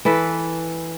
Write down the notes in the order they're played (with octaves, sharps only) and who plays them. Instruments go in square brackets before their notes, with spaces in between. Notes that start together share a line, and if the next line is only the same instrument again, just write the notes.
[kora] E3 A4 B4